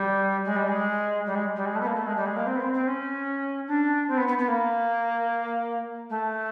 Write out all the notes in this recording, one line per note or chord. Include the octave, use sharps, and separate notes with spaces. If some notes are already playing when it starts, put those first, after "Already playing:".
Already playing: G3
G#3
G3
G#3
G3
G#3
G3
G#3
A3
B3
A#3
A3
G#3
G3
G#3
A#3
C4
B3
C4
C4
C#4
D4
C4
B3
B3
B3
A#3
A3